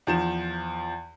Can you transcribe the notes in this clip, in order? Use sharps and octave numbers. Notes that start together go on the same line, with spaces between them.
E2 F3 E7